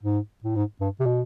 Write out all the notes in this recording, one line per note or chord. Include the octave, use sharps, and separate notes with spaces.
G#2
A2
G#2
G2
C3
B2